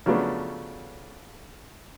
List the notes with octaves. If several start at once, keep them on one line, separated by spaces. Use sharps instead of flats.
C#3 F3 F#3 A3 B3 D4